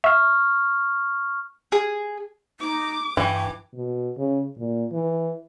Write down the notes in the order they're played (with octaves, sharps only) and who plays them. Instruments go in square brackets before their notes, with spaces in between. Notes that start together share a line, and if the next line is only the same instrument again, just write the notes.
[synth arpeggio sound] E5 [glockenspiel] C#6 F6
[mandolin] G#4
[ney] D#4 [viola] D6
[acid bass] G2 [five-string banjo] E3 [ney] G5
[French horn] B2
C#3
A#2
E3